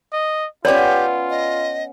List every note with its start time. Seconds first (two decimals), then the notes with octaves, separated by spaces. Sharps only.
0.13 D#5
0.65 B3 C#4 F4 G4 C#5 D5
1.30 D#5